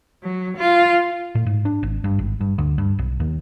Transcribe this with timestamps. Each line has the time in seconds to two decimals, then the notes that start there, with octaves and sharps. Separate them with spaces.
0.22 F#3
0.57 F4
1.35 A2
1.46 G#2
1.65 D4
1.83 G#1
2.04 G2
2.19 G#1
2.41 G2
2.58 D2
2.78 G2
2.99 B1
3.20 D#2